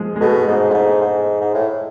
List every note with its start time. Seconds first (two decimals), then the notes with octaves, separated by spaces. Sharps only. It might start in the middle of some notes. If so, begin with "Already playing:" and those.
Already playing: F3 G#3
0.16 G#3
0.21 B2 A3
0.48 G#2
0.70 F2
0.74 G#2
1.01 G#2
1.41 G#2
1.54 A2